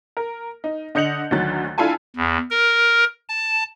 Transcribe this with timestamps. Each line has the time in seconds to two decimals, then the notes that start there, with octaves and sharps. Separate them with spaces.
0.17 A#4
0.64 D#4
0.95 D3 D#5 G6 C#7 F7 F#7
1.31 D2 D#3 F#3 F#6 A6
1.78 D4 E4 F4 A4 G#5 A5
2.16 E2
2.50 A#4
3.29 A5